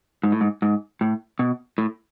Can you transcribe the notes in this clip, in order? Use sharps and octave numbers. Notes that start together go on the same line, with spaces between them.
G#2
A2
G#2
G#2
A2
B2
A2